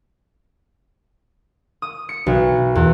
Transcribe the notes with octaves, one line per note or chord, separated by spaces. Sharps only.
D#6
C#7
B1
E2